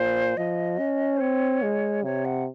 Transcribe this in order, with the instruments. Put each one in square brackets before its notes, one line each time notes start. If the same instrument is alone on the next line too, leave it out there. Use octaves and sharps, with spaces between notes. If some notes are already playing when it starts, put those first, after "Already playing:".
Already playing: [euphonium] A#2 [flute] C5
[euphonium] F3 [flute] D#5
[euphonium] C#4
[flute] C5
[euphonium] C4 [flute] C#5
[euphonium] G#3
[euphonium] C3 [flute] C#5
[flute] F#5